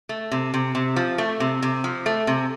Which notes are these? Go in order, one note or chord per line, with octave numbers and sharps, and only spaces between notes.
A3
C3
C3
C3
F3
A3
C3
C3
F3
A3
C3